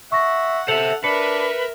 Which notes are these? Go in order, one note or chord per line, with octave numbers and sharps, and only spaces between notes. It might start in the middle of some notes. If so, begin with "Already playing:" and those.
E5 F#5 C#6 A#6
A4 C5 E5 C#7 F7 F#7
D4 A#4 B4 E5 C#7